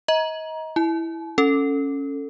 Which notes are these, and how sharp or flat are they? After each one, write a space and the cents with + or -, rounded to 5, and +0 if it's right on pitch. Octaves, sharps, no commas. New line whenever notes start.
D#5 +30 A#5 +20
E4 +0 A5 -45
C#4 +0 A4 +15